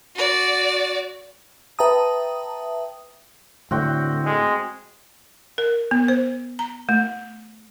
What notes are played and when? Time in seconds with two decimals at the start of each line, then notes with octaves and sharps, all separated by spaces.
0.16 F#4 D5
1.79 B4 E5 G5 A5 A#5 D#6
3.71 A2 D3 C4 F#4 G5
4.25 G#3
5.58 A#4
5.91 B3
6.08 C5
6.59 A#5
6.89 A3